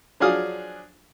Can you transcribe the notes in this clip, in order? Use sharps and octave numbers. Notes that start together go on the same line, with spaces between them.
F3 F#3 D4 G#4 F5 D#6